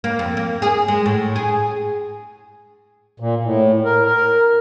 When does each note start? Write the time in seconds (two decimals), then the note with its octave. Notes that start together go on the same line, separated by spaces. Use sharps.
0.04 A#3
0.19 F2
0.37 A#3
0.62 G#4
0.88 G#3
1.06 A2
1.36 G#4
3.20 A#2
3.44 A2
3.85 A#4
4.06 A#4